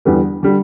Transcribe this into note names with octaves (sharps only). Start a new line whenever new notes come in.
E2 D3 G3 B3
D3 G3